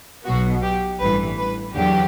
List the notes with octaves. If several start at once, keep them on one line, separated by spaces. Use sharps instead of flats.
B1 B2 F#3 B3 F#4
G4
A1 G2 E3 B4
B4
E2 D3 F#3 G4